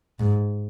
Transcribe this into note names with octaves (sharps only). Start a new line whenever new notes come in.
G#2